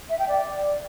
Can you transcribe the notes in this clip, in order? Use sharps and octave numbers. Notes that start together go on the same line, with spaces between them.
E5
G5
D5